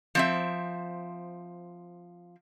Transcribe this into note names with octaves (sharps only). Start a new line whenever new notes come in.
F3 C4 E5